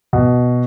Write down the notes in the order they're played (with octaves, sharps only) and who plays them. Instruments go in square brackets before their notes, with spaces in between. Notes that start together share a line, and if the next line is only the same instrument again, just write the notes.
[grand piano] B2